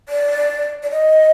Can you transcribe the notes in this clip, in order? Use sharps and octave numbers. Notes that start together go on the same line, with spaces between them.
D5
D5
D#5